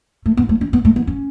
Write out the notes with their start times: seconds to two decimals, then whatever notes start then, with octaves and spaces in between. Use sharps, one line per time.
0.26 A3
0.37 B3
0.49 A3
0.61 C#4
0.73 B3
0.85 A3
0.96 B3
1.07 C#4